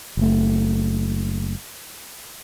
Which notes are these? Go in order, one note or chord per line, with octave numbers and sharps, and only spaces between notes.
F#1 A3